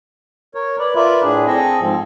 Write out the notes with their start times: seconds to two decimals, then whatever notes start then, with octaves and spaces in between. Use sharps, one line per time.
0.55 A#4 C#5
0.79 B4 D5
0.95 F4 A#4 B4 D5 E5
1.23 A2 D4 G#4
1.47 C4 G#4 A4 D#5
1.80 G#2 F3 C4